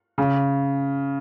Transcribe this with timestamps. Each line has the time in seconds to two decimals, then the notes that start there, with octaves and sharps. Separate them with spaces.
0.18 C#3